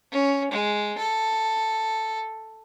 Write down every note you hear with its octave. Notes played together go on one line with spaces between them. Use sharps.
C#4
G#3
A4